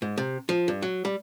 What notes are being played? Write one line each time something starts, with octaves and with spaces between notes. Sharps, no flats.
G#2
C3
F3
G2
F#3
G3